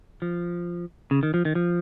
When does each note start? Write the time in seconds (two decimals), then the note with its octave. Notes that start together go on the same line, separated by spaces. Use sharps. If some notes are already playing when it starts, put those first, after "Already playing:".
0.22 F3
1.11 C#3
1.23 D#3
1.34 F3
1.45 D#3
1.55 F3